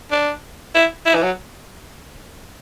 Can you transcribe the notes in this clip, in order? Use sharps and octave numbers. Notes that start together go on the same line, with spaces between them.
D4
E4
E4
E3
F#3